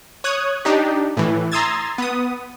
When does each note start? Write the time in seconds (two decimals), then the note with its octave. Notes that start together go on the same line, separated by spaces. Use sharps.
0.24 C#5 D#6 F#6 G#6
0.65 D4 D#4 G4
1.17 A2 E3
1.52 A#5 C6 D#6 E6 G#6 A6
1.98 B3 D#6